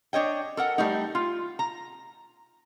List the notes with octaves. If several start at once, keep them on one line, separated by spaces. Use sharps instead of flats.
D4 C#5 D#5 G5
A4 A#4 F#5
G3 A3 D#4
F4
A#5